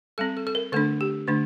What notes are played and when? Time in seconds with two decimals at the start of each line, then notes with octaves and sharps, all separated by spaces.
0.18 G3 C4 A4
0.37 A4
0.47 A4
0.55 A#4
0.72 D3 A3 D4 A4
1.01 G4
1.27 D3 A3 D4